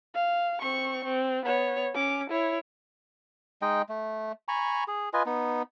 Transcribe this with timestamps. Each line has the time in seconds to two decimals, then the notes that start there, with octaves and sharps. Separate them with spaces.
0.14 F5
0.62 C4 C#6
1.05 C4
1.45 B3 C#5
1.94 C#4 D6
2.30 E4 C#5
3.62 G#3 D#4 D#5 G5
3.89 A3
4.48 G#5 A#5 B5 C#6
4.88 G#4
5.13 F4 B4 D#5 G#5
5.26 B3 D#4